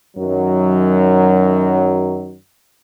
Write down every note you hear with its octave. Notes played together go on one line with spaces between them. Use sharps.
F#2 D#3 F#3